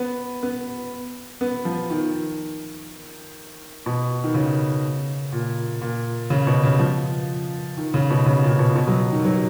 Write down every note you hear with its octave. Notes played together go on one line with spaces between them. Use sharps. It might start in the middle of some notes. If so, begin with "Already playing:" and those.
Already playing: B3
B3
B3
F3
D#3
B2
D#3
C#3
A#2
A#2
C#3
B2
C#3
F3
D#3
C#3
B2
C#3
A#2
B2
B2
F#3
D#3
F#3